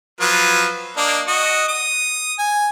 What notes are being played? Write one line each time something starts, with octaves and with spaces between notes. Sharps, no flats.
F3 F#3 B4
A#3 D4 D#5
F#4 D#5
D#6
G#5